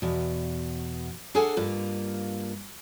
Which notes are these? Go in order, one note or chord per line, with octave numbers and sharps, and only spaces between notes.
E2 B2
D4 G#4 A4 F#5 G#5
G2 A#3 F4